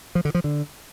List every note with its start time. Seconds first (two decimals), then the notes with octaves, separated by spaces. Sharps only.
0.15 F3
0.25 D3
0.35 F3
0.44 D3